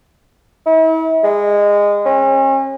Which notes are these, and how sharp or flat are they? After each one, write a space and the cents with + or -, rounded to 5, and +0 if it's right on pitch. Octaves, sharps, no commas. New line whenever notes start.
E4 -40
G#3 -20
C#4 -40